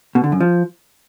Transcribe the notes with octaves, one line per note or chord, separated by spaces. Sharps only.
B2
D3
F#2
F3